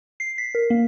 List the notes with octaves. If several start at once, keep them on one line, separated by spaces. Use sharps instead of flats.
C7
B6
A#4
A#3